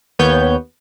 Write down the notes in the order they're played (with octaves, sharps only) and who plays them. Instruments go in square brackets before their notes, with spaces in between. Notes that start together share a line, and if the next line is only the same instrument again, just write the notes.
[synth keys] D#2 B3 C#5 G6